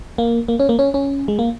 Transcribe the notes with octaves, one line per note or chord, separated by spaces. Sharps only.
A#3
A#3
C#4
A#3
C#4
C#4
G#3
A#3